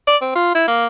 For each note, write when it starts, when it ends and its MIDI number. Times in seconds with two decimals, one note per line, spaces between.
0.08 0.16 74
0.22 0.34 60
0.35 0.51 65
0.55 0.66 64
0.68 0.87 58